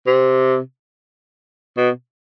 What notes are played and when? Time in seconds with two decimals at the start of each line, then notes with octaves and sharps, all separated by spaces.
0.07 C3
1.77 B2